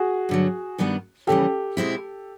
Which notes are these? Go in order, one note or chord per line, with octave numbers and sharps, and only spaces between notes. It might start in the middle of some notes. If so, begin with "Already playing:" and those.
Already playing: F#4 G#4
G2 D3 F#3
G2 D#3 G3 B3 D4
D#2 C#3 E3 G3 G4 A4
B2 G#3 C4 E4